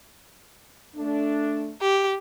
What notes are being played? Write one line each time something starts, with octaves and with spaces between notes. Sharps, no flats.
A3 D4
G4